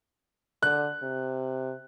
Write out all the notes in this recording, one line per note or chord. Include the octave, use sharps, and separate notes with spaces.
D3 F#6
C3